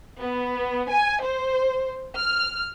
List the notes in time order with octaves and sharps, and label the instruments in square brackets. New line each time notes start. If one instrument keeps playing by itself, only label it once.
[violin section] B3
G#5
C5
F6